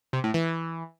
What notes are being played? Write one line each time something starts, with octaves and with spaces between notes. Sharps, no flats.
C3
A2
E3